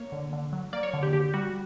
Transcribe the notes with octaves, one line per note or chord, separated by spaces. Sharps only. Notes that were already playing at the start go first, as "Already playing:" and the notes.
Already playing: A#3 C#5
D3
D3
F#3
A#3 D5
C#5
D3
G4
D3 G4
G3 F#4